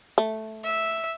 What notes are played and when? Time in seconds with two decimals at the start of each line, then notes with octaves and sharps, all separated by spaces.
0.18 A3
0.64 E5